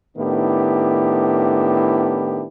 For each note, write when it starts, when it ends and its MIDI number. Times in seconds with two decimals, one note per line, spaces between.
0.17 2.46 45
0.17 2.46 51
0.17 2.46 59
0.17 2.46 62
0.17 2.46 64
0.17 2.46 67